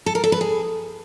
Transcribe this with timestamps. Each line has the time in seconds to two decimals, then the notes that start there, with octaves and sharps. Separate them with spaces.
0.06 A4
0.15 A#4
0.24 A4
0.32 B4
0.41 G#4